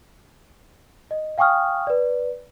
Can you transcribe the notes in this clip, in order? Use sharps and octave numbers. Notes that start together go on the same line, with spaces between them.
D#5
F5 G5 G#5 C#6 D#6 F6
B4 D5